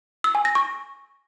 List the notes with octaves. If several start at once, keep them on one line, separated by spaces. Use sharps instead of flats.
E6
G#5
A#6
C#6